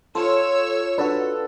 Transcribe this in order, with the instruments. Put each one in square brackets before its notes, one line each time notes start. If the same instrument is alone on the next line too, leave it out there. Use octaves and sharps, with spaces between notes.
[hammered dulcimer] F4 [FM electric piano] A4 [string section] C#5 E6
[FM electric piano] D4 F#4 [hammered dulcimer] A4 B4